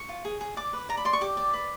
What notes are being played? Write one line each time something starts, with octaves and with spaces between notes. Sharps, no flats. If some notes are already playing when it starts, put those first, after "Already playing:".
Already playing: C#6
F4
G#4
G#4
D5 D6
B4
D5 A#5
B5
D5 C6
C#6
G4 D6
D5
B4